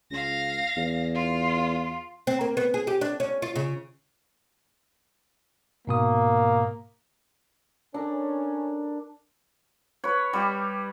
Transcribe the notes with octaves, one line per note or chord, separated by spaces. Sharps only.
C#2 F5 A#6
E2
F4
C4
A#3
B3
G#4
G4
D4
C#4
F4
C#3
G#2 B2 A#3 D#6
C#4 D4 A4 A#4
B4 C#5
G3 G4